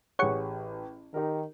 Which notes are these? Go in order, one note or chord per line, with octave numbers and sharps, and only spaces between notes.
A1 G4 G#4 C#5 F#5 C#6
D#3 D#4 G4 A#4